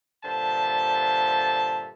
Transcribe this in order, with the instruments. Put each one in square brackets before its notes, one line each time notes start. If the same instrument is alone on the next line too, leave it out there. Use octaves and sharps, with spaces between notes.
[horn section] G2 A#2 D3 C5 E5 A5